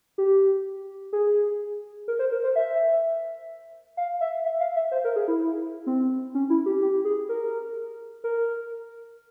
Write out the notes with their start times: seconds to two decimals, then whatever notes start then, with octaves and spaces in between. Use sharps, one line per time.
0.18 G4
1.13 G#4
2.08 A#4
2.19 C5
2.32 A#4
2.44 C5
2.56 E5
3.97 F5
4.21 E5
4.45 E5
4.61 F5
4.76 E5
4.92 C5
5.04 A#4
5.16 G#4
5.28 E4
5.87 C4
6.35 C#4
6.50 E4
6.66 G4
6.82 G4
7.05 G#4
7.29 A#4
8.24 A#4